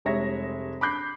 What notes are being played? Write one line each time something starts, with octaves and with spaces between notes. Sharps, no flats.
F1 G3 G#3 C#5 E5 A#6
B5 D6 F#6 G6 C7